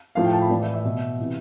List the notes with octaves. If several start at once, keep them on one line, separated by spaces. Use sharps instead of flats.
A2 F3 F5
G5
A5
B5
A2 E3 D5
E5
E5
B2
C3 E3